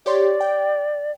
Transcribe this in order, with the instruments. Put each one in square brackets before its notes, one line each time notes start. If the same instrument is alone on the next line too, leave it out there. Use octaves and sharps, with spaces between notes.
[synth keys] G4 C#5 C6 [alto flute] D5
[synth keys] G5